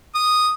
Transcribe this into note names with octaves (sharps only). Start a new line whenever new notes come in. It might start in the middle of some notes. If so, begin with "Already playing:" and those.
D#6